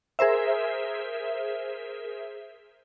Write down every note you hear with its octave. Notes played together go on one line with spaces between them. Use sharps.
G#4 A#4 C5 E5